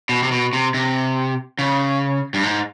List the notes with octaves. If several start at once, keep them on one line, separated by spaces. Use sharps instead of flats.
B2
C3
B2
C3
C3
C#3
G2
G#2